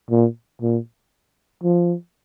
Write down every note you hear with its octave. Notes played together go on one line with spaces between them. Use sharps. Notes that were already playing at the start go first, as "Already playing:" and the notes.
A#2
A#2
F3